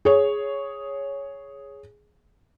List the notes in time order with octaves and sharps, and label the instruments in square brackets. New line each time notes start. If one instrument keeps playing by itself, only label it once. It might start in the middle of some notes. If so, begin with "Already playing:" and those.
[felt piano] G#4 C#5